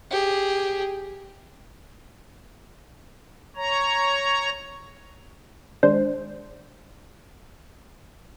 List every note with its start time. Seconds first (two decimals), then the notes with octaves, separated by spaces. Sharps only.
0.11 G4 G#4
3.56 C#5 A#5
5.83 D#3 G#3 D4 C5